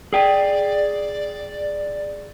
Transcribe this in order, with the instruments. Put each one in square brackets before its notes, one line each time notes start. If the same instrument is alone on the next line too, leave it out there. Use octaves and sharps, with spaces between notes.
[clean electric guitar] G#4 G5 [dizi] D5